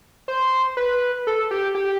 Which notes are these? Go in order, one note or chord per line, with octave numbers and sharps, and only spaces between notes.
C5
B4
A4
G4
G4